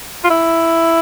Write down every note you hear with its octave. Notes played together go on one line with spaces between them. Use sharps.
F4
E4